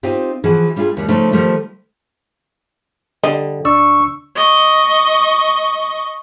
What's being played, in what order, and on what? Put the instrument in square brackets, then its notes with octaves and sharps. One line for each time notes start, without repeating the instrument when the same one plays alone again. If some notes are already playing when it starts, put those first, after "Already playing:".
[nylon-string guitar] C4 D#4 F4 G4
E3 F3 F#4 G#4
G3 D4 E4 F4 G#4
D#2 G3
C#3 F3 A3 D#4
D#3 F3 G3 A3
[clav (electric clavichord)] D3 G3 [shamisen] D#5
[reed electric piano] D2 D4 E6 [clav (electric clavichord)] D5 [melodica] C#6
[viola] D#5 C#6